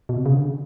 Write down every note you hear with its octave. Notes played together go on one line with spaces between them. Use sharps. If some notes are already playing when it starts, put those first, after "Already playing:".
B2
C3
C#3
D3